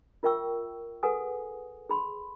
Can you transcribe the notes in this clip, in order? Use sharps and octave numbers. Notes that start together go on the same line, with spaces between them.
F4 A#4 E5 G5 C#6 E6
G#4 A4 B4 F#5 G#5 D#6
G#4 B5 C6